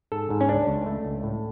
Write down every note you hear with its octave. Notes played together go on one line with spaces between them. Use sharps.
G#2 A4
G#2
C#4
C#2 D4
C#2
A3
C#2
A2